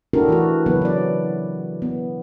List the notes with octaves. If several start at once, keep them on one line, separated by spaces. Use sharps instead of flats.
D4 E4 F#4 G4 A4 A#4
E3 A3 F#4
C#3 E3 F#3 B3 B4
E4 D5
B3